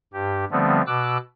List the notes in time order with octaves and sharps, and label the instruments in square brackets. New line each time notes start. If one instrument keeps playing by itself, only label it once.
[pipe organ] G2 G4
D3 F3 G3 A3 B3 C4
B2 D6 E6 F#6